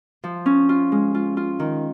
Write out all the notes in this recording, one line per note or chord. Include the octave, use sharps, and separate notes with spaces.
F3
C#4
F4
G#3
F4
F4
D#3